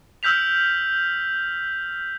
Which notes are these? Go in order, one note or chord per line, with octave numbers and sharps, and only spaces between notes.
E6 F6 G6 B6 F7